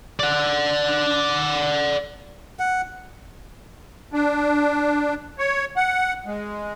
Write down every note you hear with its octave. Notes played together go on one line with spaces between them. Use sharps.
D5 F#5
F#5
D4
C#5
F#5
G#3